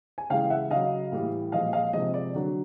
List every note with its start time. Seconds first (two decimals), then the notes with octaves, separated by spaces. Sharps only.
0.18 G#5
0.30 C#3 E3 G#3 F5 G5
0.50 E5 F#5
0.71 C#3 F#3 D#5 F5
1.12 A2 E3 G3
1.52 A#2 F3 G#3 D#5 F5
1.73 D#5 F5
1.93 C3 F3 G#3 D#5
2.14 D5
2.34 D3 F#3